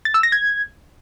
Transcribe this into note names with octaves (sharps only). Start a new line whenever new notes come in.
A6
E6
A#6
G#6